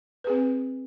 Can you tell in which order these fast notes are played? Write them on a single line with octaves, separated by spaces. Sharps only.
B4 G#4 C4